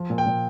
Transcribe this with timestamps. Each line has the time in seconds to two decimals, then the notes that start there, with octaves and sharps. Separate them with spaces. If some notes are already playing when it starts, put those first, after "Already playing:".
Already playing: F3
0.10 A#2
0.18 G5
0.26 A#2